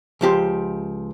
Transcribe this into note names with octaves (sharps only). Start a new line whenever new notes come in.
C#2 F3 G4 C6